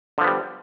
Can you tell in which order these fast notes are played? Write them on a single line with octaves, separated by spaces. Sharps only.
D3 F3 B3 G3